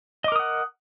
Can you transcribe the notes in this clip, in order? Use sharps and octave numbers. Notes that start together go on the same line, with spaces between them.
A#4 D#5 F#5 D6 D#6